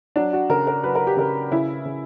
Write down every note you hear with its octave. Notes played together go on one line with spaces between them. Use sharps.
F#3 D4
F#4
C#3 A#4
A#4
F#3 B4
A#4
G4
C#3 A#4
C#3 E4
C#3